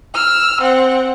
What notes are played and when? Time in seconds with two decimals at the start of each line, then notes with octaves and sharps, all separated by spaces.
0.14 E6 F6
0.61 C4 F#5